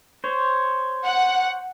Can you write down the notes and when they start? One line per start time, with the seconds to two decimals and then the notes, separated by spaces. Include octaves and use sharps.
0.24 C5 C#5
1.05 F#5